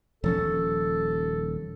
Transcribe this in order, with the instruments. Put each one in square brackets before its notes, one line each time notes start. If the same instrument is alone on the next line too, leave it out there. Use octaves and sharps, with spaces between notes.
[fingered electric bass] D#1 F3 C#4 [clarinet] A4